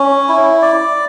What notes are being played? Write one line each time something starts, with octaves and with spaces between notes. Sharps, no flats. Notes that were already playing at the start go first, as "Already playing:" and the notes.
Already playing: C#4
E4
D5